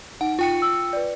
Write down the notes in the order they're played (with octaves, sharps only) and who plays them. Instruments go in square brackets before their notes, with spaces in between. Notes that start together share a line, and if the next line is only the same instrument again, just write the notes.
[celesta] D#4 [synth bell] F#5
[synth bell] F4 G5 C#7
[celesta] E6
B4 D5